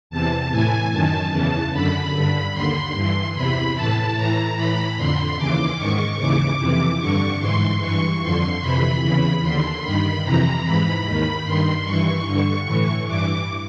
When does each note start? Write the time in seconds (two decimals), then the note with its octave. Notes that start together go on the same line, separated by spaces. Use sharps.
0.10 E2 C3 E3 A5
0.51 A2 E3 G#5
0.91 F#2 D#3 A5
1.32 E2 C#3 E3
1.72 F#2 D3 B5
2.13 G2 D3 B5
2.53 D#2 D3 C6
2.94 G2 E3
3.34 E2 C3 E3 B5
3.74 A2 E3 A5
4.15 A2 E3 A#5
4.56 A2 E3 B5
4.96 F2 D3 C6
5.37 D#2 C#3 E3 D6
5.78 G#2 D#3 C#6
6.18 D#2 C#3 E3 D6
6.59 F2 C3 E3
6.99 G2 D3 C#6
7.40 G#2 E3 C6
7.80 G2 E3 C#6
8.21 F2 D3 C6
8.61 F2 C3 E3 B5
9.02 E2 C#3 E3
9.42 D#2 D3 C6
9.82 G2 D#3 B5
10.24 F2 C3 E3 A#5
10.63 G#2 E3 B5
11.05 D#2 D#3
11.44 G2 D#3 C6
11.85 G2 E3 C#6
12.26 G2 D3
12.66 A2 E3
13.07 G2 E3 D6